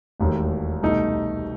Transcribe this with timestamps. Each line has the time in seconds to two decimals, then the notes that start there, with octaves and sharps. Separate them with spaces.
0.20 E1 D#2 D#3 A3
0.82 C2 B2 A3 D#4